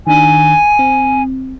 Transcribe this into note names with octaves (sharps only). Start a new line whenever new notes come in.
D#3 D4 G#5
C4